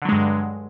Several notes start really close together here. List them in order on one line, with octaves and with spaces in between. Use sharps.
D3 F#3 G#3 G2